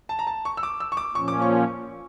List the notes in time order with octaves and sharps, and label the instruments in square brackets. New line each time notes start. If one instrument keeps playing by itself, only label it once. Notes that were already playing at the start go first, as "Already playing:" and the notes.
[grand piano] A5
A#5
A5
C#6
E6
D6
E6
C#6
D6
[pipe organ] A#2 F3 C#4 [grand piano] C#6
[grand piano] D6
C#6